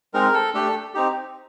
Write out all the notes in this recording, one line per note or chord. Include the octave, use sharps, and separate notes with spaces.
G#3 C4 D#4 A#4
A4
A3 D4 G4 A4
C4 D#4 G4